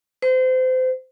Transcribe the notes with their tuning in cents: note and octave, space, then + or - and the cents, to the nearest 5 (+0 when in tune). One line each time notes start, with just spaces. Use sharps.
C5 -30